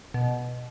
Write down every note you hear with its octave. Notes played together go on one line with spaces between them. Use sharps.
B2